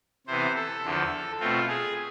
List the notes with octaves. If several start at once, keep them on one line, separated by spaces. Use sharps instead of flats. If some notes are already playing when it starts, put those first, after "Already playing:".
C3 E3 B3 C5
A4
E2 D3 F3
B2 A3 C4 F4
G#4